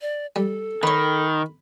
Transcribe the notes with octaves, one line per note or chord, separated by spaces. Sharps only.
D5
G3 A4
D#3 B4 C#5 B5